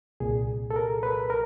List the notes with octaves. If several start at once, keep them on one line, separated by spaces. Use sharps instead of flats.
C2 A#2 G#4
A4
A#4
B4
A#4